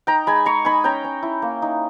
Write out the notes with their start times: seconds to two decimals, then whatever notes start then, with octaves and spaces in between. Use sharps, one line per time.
0.07 D#4 G5 A#5
0.27 G#3 G#5 B5
0.46 G#3 A#5 C#6
0.65 D#4 G#5 B5
0.84 C#4 G5 A#5
1.04 C#4
1.23 E4
1.42 A#3
1.62 D#4